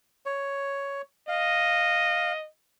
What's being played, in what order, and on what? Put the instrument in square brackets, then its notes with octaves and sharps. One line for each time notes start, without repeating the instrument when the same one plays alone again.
[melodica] C#5
[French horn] D#5 [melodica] F5